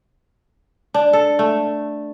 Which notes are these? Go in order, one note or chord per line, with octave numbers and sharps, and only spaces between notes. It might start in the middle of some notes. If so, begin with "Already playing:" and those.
D4
A4
A3